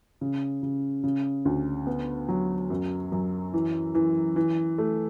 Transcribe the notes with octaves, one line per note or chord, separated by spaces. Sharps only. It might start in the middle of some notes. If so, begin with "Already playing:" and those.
C#3
C#3
C#3
D2
B3
F#3
F#2
F#2
E3
E3
E3
A3